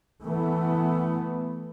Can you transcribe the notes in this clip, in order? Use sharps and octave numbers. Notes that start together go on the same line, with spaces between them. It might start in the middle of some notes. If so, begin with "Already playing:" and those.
E3 A3 B3